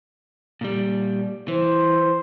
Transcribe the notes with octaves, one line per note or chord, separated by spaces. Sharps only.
A#2 G3
E3 C5